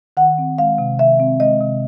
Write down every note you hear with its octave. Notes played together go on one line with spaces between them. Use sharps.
D#3 F#5
C4
G#3 F5
C3
D#3 E5
C4
G#3 D#5
C3